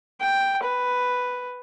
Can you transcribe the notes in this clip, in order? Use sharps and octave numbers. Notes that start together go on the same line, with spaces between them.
G5
B4